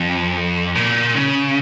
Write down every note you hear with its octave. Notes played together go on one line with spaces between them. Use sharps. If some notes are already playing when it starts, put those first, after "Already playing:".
Already playing: F2
A#2
C#3